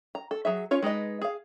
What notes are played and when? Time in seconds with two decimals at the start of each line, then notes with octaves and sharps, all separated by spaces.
0.15 A#5
0.31 A4
0.45 F#3 G#4 E5
0.71 C#4 F4 C#5
0.82 G#3 D#4 B4 D#5
1.22 G#4 F5